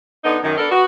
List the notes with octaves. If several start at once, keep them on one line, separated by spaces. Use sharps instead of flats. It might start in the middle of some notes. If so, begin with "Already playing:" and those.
D3 B3 D#4
F#2 D#3
B3 D4 A4 A#4
B3 F#4